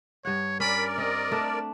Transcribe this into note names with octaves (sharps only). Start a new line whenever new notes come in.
G2 C#5 F#5
C#4 A#4 D5 B5
C4 D#5
A3 D4